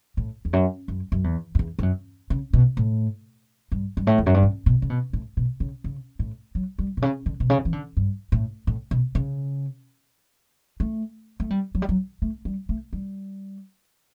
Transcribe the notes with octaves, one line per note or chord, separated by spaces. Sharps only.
A2
E2
F#2
F#2
F#2
E2
F#2
E2
G2
F#2
C#3
B2
A2
G2
G2
A2
E2
F#2
G2
A2
B2
C#3
B2
A2
B2
C#3
C#3
A2
F#3
G3
B2
C#3
D3
B2
C#3
E3
D3
G2
A2
A2
B2
C#3
A3
A3
G3
F#3
G3
F#3
A3
G3
A3
G3